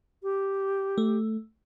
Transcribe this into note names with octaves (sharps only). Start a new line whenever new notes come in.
G4
A3